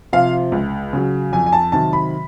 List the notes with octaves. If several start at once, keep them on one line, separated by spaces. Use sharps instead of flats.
C3 F3 F5
C#2
C#3 F#3
F2 G#5
G#5
A5
C3 D#3 F#3 A5
B5